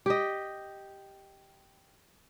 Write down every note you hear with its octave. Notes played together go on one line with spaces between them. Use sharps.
G4 D#5